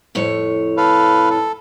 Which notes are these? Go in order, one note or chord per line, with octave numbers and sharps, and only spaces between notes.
F2 A2 C#5
A4 B4 F5
A4